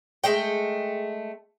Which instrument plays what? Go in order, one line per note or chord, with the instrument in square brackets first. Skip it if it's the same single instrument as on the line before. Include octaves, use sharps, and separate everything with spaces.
[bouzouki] G#3 A3 G5